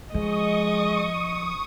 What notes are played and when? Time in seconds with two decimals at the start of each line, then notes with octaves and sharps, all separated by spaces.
0.14 F3 G#3 D#5 C#6 D#6